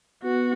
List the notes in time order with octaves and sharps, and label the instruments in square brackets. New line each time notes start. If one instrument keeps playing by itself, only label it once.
[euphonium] B3 [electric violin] F#4